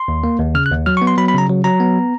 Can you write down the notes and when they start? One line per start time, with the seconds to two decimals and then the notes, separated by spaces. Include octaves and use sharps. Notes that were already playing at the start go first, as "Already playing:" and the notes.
Already playing: C6
0.08 D#2
0.24 A#3
0.39 D#2
0.55 C#3 F6
0.66 F#6
0.71 D#2
0.86 F#3 F6
0.97 C#6
1.02 B3
1.07 C6
1.18 F#3 B5
1.28 B5
1.34 C#3 A#5
1.49 F#3
1.64 F#3 A#5
1.80 B3